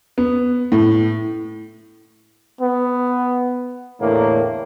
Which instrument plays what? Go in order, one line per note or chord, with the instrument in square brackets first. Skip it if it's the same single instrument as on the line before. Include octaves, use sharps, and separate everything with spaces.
[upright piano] B3
A2
[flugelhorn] B3
[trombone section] E2 D3 A#3 [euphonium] A2